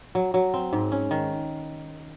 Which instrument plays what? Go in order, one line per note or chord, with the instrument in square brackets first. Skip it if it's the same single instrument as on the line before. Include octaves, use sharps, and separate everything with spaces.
[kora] F#3
F#3
C4
G#2
C#4
D#3